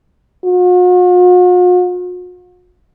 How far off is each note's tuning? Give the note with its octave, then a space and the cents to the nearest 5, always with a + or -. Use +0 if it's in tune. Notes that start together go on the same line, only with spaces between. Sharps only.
F#4 -45